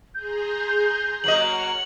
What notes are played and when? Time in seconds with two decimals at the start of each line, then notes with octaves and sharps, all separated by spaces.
0.14 G#4 A#5 C6 G6
1.24 F#3 A#3 C#5 D#5 F#5 F6 F#7